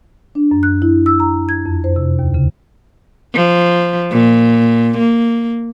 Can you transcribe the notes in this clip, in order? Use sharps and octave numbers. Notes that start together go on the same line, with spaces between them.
D4
F#2
F#6
E4
E6
A#5
G#6
F2
C5
C3
D#2
C#3
F3
A#2
A#3